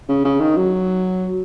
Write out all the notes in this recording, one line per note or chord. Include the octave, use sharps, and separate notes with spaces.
C#3
C#3
D#3
F#3